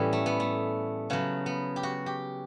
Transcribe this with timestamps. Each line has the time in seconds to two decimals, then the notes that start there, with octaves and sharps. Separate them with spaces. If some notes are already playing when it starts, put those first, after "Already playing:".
Already playing: A2 E3 G3 B3 C#4
0.13 A3
0.26 B3
0.40 A3
1.10 C#3 F#3 B3
1.46 B3
1.76 G4
1.83 F#4
2.06 G4